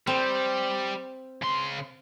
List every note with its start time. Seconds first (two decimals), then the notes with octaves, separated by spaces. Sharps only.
0.07 G3 C4
1.42 C#3 C6